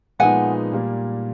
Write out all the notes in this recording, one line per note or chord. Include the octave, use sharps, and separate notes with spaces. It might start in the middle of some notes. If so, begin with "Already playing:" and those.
A#2 F3 G#3 B3 D#4 F#5 G#5
A#2 G3 A#3